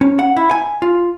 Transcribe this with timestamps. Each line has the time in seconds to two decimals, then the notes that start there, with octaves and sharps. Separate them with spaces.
0.01 C#4
0.19 F#5
0.36 E4
0.51 G#5
0.82 F4